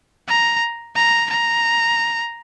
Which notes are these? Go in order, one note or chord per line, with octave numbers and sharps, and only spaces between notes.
A#5
A#5
A#5